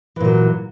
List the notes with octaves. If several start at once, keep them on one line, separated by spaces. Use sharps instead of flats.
A#2 E3 F#3